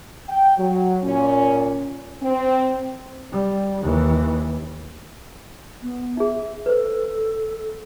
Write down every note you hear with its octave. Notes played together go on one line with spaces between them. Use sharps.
G5
F#3
A#2 C#4
C4
G3
D#2 E3
B3
D#4 G#4 E5
A4 B4 C5